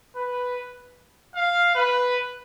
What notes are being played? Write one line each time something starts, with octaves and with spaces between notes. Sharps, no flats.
B4
F5
B4